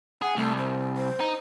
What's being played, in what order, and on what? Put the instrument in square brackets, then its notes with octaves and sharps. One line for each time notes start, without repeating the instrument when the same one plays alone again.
[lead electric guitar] G#4 [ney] F#5
[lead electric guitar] C2 [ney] A3
[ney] C5
C5
[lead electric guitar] D#4